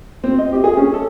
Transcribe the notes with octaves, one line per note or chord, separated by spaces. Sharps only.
C4
D#5
G4
G#4
C#4
A4